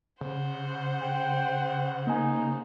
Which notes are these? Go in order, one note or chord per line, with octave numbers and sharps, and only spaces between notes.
C#3 C5 F#5
C#3 G5
A#3 D#4 G#5